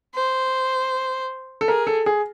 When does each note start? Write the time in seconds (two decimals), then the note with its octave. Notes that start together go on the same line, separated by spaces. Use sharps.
0.15 C5
1.61 A4
1.68 G#4 A#4
1.87 A4
2.06 G#4